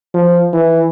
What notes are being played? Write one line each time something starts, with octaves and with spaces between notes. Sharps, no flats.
F3
E3